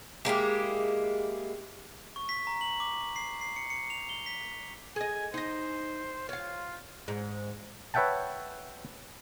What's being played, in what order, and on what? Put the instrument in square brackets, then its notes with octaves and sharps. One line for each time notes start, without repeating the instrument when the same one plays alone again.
[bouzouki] G#3 A#3 E4 G4
[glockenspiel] C#6
B6
A#5
F#7
D6
C7
C7
C#7
C#7
F7
G7
B6
[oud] G#4 D#5 [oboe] G#5
[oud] D#4 D#5 [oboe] C5
[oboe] F4 [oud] C#5 F5
[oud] G#2
[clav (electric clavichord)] B4 C#5 E5 F#5 G5 A5